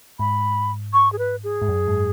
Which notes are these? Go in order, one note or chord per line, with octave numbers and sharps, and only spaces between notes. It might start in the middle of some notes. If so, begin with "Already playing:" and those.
G#2 B5
C#6
G#4
B4
G#4
G#2
F#2
G#2